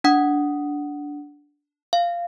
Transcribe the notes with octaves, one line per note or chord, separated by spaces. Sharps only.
D4 F#5 D#6
F5